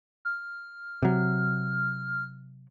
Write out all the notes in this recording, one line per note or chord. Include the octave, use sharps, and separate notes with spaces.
F6
C3 F#3